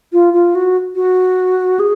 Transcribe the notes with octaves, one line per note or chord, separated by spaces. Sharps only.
F4
F4
F#4
F#4
G#4